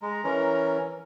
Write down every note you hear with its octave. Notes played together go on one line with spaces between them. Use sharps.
G#3 A#5
E3 C#4 A#4